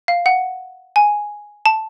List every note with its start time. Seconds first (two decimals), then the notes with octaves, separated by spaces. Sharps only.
0.08 F5
0.26 F#5
0.96 G#5
1.66 A5